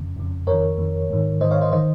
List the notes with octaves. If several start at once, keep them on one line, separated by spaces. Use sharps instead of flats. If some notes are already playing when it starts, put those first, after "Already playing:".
Already playing: F2 C#3
F2 C#3
F2 D#3 A#4 C#5
F2 D#3
G#2 D#3
G#2 D#3 C5 D#5
C#5 F5
C5 D#5
D#3 C5 D#5